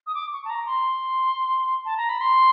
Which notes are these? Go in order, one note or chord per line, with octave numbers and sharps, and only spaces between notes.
D#6
D6
C#6
A5
A#5
C6
A5
A#5
B5
C6